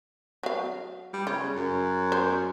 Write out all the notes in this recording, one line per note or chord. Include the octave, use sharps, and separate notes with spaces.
F#3 F5
G3
C#3 F4
F#2
C5